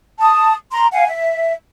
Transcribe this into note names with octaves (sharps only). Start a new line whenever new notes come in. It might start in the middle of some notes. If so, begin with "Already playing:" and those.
A5 D#6
A#5 C6
F5 F#5 G#5
E5